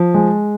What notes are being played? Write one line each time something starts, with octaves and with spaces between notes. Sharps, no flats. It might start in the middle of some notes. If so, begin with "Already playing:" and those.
Already playing: F3
G#3